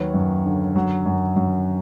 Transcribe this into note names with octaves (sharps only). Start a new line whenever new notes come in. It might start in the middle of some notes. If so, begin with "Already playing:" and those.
Already playing: D#2 F#3 B4 C#5
F#2
D3
F#3
F#2
F#2